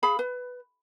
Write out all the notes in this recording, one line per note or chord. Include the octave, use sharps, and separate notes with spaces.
G#4 F5 B5
B4